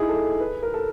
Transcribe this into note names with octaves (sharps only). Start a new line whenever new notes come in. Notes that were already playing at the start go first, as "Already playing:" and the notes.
Already playing: D#4 E4 G#4
A4
B4
A#4
A4